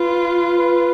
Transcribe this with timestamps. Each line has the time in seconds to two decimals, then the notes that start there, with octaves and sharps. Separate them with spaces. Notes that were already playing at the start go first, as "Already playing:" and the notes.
Already playing: F4 B4
0.59 B4